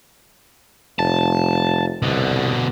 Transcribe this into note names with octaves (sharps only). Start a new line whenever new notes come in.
F1 A5
C2 B2 D3